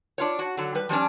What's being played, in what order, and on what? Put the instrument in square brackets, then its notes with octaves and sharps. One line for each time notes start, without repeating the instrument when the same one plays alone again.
[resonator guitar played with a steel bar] D4 F4 C#5
F#4
D3 F#3
G3 B4
F3 G3 C#4 D4